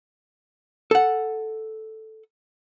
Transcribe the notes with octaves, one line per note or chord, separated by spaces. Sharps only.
A4 F#5